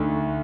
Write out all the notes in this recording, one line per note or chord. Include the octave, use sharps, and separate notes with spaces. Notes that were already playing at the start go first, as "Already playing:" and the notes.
Already playing: D2 D3 A3 D#4